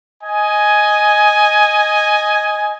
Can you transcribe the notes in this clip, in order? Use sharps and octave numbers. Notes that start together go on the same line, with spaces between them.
D#5 G#5